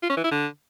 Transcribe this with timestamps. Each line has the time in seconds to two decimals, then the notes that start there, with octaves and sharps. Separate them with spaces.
0.03 F4
0.10 C#4
0.17 E3
0.24 E4
0.31 D3